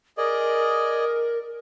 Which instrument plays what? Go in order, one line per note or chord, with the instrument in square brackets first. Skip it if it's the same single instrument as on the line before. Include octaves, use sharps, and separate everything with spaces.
[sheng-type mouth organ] G#4 D5 D#5 [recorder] A#4